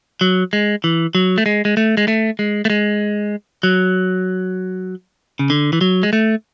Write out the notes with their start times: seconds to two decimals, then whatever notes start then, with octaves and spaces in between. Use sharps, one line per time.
0.21 F#3
0.53 G#3
0.84 E3
1.15 F#3
1.38 A3
1.46 G#3
1.65 G#3
1.77 A3
1.97 G#3
2.08 A3
2.39 G#3
2.65 A3
2.70 G#3
3.63 F#3
5.39 C#3
5.50 D3
5.73 E3
5.81 F#3
6.03 G#3
6.13 A3